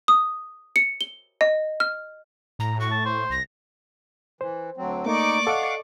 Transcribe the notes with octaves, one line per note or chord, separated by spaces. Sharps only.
D#6
C#7
G7
D#5
F6
A2 A#5
F#4 C#6
A5
C5
C2 A#6
E3 C5
D2 F#3 C4
A3 A#3 D#4 D5 C#6 D6
A4 D#5 F5 F#5